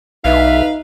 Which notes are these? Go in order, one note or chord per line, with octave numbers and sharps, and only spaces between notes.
B1 D#4 B4 E5 F5